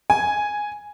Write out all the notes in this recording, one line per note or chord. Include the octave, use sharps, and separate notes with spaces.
G#5